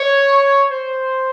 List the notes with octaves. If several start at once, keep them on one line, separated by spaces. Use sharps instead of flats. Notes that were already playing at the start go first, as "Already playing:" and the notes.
Already playing: C#5
C5